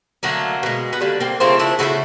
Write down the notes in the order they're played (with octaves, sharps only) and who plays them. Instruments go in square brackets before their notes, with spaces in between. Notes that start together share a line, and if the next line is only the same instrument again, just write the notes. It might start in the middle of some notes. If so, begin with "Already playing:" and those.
[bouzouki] D3 F#3 A3 A#3
B2 G#3
B3
D3 G3 A#3
A#3 C4
C#3 F3 A3 A#3 C4
D4 E4
C#3 F3 A3 E4 F#4